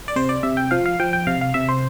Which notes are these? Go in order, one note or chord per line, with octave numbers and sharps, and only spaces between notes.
D5
C3 C5
D5
C3 E5
G5
F3 F5
F5
F3 G5
G5
C3 F5
F5
C3 E5
C5